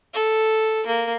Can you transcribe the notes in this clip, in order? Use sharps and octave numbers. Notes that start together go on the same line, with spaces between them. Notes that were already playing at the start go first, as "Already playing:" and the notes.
A4
A#3